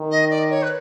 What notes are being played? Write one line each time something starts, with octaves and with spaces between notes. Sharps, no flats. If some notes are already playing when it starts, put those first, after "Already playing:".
Already playing: D#3
D#5
D5
C#5
B4